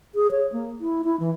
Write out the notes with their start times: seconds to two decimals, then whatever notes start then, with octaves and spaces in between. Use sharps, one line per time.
0.15 G#4
0.31 C#5
0.52 A#3
0.80 E4
1.04 E4
1.20 E3